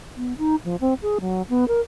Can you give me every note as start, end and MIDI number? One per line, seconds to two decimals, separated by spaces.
0.17 0.36 59
0.38 0.56 63
0.65 0.76 53
0.81 0.94 60
1.02 1.19 68
1.21 1.42 54
1.49 1.67 59
1.68 1.80 70